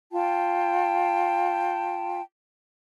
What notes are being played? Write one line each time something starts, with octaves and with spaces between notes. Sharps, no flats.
F4 G5 A5